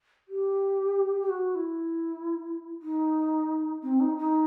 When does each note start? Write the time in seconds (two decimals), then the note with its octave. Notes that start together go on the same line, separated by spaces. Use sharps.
0.28 G4
1.22 G4
1.30 F#4
1.55 E4
2.82 D#4
3.83 C4
4.00 D#4
4.17 D#4